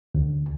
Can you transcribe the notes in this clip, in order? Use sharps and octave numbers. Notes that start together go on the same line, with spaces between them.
D2